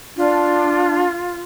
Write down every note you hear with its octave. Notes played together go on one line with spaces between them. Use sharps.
D4 F4